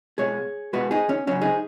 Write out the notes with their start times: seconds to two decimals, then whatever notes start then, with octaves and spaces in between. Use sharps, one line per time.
0.18 B2 G#3 G#4 C#5
0.73 B2 G#3 F#4 B4
0.91 D#4 G#4
1.09 C#4
1.27 C#3 F#3 C#4 F#4
1.41 D#4 G#4